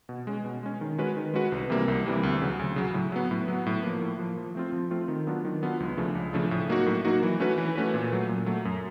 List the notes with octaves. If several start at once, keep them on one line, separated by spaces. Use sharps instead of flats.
B2
G#3 C#4
B2
G#3 C#4
D#3
G#3 C#4 F#4 B4
D#3
G#3 C#4 F#4 B4
C2
C3 E3 G3 A#3
C2
C3 E3 G3 A#3
D2
C#3 F#3
D2
C#3 F#3
A2
F#3 B3
A2
F#3 B3
A2
F3 A#3
A2
F3 A#3
F3
A3 C4 F4
F3
A3 C4 F4
D#3
F#3 B3 D4 F4
D#3
F#3 B3 D4 F4
C#2
C#3 F3 A3 D4
C#2
C#3 F3 A3 D4
A2
F#3 A#3 D#4 F#4
A2
F#3 A#3 D#4 F#4
E3
A3 C#4 F#4 B4
E3
A3 C#4 F#4 B4
A#2
F#3 A3
A#2
F#3 A3
F#2